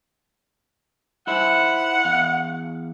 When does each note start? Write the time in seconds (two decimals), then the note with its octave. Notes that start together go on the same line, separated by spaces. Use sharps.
1.27 D#4 E4 C5 F#5
2.04 E2 F5